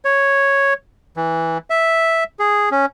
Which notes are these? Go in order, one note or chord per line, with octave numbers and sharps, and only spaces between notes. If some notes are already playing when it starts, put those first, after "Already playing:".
C#5
E3
E5
G#4
C#4